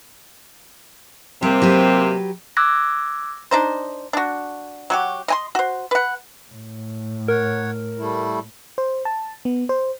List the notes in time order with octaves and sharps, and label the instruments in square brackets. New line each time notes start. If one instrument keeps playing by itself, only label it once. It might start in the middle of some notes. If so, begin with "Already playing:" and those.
[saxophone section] C3 A#3 C4 [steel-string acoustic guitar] G3
[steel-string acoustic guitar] F#3 G4 B4
[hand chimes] D6 E6 F#6 G#6 A#6
[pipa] D4 D#4 C5
D4 F#4
F#3 F#4 G4
D#5 G#5 C6
F#4 C5
B4 F#5
[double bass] A2
[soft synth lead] A#4 [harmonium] C#5 F#5
[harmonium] G3 A3 E4
[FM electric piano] C5
A5
B3
C5